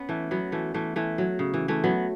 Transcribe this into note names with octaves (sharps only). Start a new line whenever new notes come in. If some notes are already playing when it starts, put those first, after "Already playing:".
Already playing: B3 C#4
E3 A3
F#3 B3
E3 A3
E3 A3
E3 A3
F#3
C#3
E3
E3 A3
F#3 B3